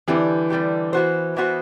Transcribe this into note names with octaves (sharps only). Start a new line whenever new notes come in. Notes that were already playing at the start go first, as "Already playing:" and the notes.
D3 E3 G3 C4 G4
D3 G3 C4 G4
E3 B3 F#4 C5
E3 B3 F#4 C5